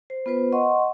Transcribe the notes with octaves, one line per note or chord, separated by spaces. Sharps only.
C5
B3 F4 B4 C5
D#5 F#5 C6 C#6